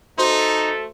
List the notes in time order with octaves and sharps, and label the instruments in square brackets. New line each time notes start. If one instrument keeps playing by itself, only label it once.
[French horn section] A3 A4 [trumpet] D#4 [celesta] F#4 C5 C6